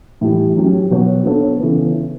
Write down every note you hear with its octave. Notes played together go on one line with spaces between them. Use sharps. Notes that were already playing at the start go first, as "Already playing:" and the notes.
A2 E3 G3
F#3 C#4 G4
B2 F#3 B3 F#4 C#5
B3 D4 A4 C#5
C#3 E3 B3